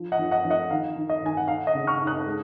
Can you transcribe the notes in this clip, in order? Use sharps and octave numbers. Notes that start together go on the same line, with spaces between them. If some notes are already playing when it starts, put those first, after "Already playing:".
Already playing: F3
D#5 F#5
F3
D#5 F#5
F3
D#5 F#5
D#3 F5
D#3
D#5
D#3 G#5
F#5
D#4 F5
D#5 F#5
C#3
C#6 F6
D#4
D#6 F#6
G#3